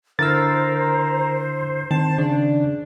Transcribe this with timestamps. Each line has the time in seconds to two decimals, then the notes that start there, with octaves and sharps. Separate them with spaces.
0.19 D3 E4 A#4 C5 E6 A6
1.91 D#3 C4 A5
2.18 C#3 D4